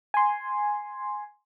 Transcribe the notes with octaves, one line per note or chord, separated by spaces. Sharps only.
G#5 C6